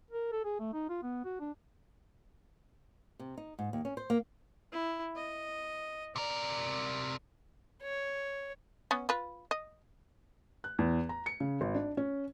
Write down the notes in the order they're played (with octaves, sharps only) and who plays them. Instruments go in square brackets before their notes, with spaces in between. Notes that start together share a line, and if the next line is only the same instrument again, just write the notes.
[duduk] A#4
A4
G#4
A3
D#4
F4
B3
F#4
D4
[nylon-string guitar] C3
D#4
G#2
D#2
C#4
C5
A#3
[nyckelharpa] E4
D#5
[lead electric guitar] C3 A#4 [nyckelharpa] D5
[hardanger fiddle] C#5
[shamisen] B3 C#4
F4 B4
D#5
[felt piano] F#6
E2
A#5
C#7
C#3
G#1
D4
C#4